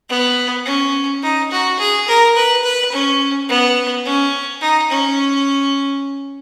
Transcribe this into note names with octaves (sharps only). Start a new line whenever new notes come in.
B3
C#4
D#4
F#4
G#4
A#4
B4
B4
C#4
B3
C#4
D#4
C#4